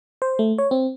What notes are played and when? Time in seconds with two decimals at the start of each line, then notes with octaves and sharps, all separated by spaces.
0.22 C5
0.39 A3
0.58 C#5
0.71 C4